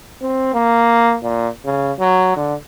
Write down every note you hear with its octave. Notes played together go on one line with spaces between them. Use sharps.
C4
A#3
A#2
C#3
F#3
D3